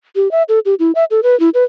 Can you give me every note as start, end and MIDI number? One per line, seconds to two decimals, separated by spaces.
0.16 0.31 67
0.31 0.43 76
0.49 0.59 69
0.65 0.75 67
0.79 0.92 64
0.95 1.05 76
1.11 1.20 69
1.23 1.38 71
1.40 1.50 64
1.54 1.64 71